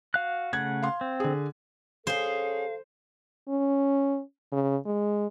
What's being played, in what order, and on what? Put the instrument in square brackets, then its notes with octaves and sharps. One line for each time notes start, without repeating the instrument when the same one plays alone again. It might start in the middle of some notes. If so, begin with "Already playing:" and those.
[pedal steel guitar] F#4 F5 F#6
[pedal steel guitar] C#3 A3 F#5 [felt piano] G#6
[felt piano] F5 C6
[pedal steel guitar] C4
[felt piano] D3 G#4
[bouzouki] C#4 G#4 [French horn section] A4 [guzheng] C5 [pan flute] F5
[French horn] C#4
C#3
G#3